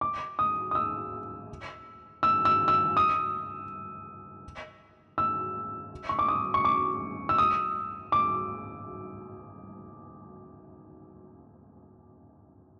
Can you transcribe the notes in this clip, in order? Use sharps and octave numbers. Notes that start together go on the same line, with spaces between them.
D6
D#6
D#6
E6
E6
E6
E6
D#6
E6
C#6
D6
D#6
C#6
D6
E6
D#6
D6